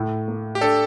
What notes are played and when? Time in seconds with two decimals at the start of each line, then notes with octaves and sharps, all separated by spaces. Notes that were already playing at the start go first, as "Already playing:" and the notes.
Already playing: A2
0.28 A#3
0.55 G4
0.61 D4 A4